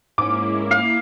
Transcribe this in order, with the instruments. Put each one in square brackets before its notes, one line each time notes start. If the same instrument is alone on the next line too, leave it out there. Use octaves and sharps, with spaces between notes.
[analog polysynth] G#2 C#4 [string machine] A#3 E4 [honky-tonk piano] D6
[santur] F5